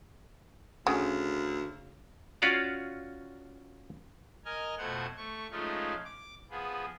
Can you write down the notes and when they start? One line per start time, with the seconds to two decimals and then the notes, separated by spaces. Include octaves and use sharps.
0.87 D2 C#3
2.42 C#4 F4 F#4 D5 F5
4.45 A#4 D#5 G#5 F6
4.78 F2 B2 A3 C5 F#5 G#6
5.17 A3 C#6
5.51 F3 G#3 A3 C#4 D#4 F4
6.05 D6
6.50 F3 B3 G#4